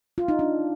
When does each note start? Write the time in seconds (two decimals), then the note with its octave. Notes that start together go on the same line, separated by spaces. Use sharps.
0.18 F4
0.28 D#4
0.39 D4